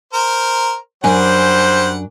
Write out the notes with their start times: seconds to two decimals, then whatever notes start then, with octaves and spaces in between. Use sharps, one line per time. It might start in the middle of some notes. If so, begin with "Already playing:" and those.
0.13 A#4 C5
1.04 F#2 G3 D4 C5 F#5 G#5